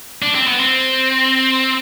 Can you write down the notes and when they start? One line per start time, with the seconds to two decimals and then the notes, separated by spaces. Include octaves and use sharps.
0.22 D4
0.35 C4
0.47 B3
0.60 C4